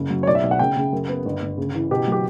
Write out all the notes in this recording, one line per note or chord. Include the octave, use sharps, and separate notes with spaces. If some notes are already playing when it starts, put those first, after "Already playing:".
Already playing: F#1 C#3
F#3
C#5
B1 D5
E5
B1
F#5
C#3 G5
C#3
F#2
B3
G1
G1
C#3
E3
B2 G4
F#3 G4